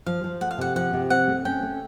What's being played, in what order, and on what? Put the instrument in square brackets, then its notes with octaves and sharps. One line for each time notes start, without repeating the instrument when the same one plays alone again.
[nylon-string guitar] F3 [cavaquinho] F5
[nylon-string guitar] F3
[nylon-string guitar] A3 [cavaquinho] F#5
[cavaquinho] F5
[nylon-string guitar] C3 [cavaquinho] F#5
[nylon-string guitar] F3 [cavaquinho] F#5
[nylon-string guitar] C3
[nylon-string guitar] C4 [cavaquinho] F#5
[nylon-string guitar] A3
[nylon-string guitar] C#4 [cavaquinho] G5
[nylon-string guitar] A3